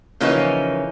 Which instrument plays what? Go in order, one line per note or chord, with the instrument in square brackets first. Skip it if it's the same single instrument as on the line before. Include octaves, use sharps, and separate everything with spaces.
[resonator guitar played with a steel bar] C#3 E3 F3 A#3 C#4 D#4